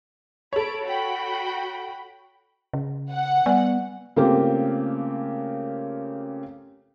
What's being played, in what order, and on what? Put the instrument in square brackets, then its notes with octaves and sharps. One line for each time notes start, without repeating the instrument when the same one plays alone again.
[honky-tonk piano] A4 C#5 [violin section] B5 D7
[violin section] F#4 G5 B5
[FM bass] C#3
[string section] F#5
[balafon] G3 D5 G#5 [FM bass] B3
[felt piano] C#3 A3 A#3 C4 F4 G4